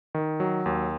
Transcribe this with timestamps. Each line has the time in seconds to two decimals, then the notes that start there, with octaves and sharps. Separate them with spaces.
0.15 D#3
0.40 F#3
0.66 D#2